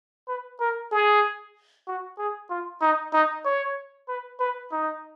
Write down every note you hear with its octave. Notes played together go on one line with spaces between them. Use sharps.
B4
A#4
G#4
F#4
G#4
F4
D#4
D#4
C#5
B4
B4
D#4